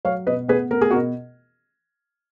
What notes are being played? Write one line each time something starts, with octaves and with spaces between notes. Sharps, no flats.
F#3 C#5 F5
B2 B4 D#5
B3 G#4 B4
B3 A#4
G#4
B2 F#4 A#4